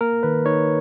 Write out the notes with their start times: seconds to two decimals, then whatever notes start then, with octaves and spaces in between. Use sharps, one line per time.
0.01 A#3 A#4
0.23 D#3 B4
0.46 D#4 C#5